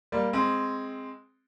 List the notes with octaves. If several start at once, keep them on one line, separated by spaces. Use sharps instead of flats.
G3 A#3
G#3 C4